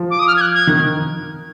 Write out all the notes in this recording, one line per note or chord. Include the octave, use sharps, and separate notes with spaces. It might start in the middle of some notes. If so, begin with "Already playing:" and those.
Already playing: F3
D6
D#6
F6
G#6
F#6
G#6
D#3